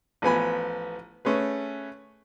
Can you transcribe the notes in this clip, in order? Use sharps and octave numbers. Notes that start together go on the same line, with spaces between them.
A1 F3 B3 G#5 B5
A3 C#4 G#4 B4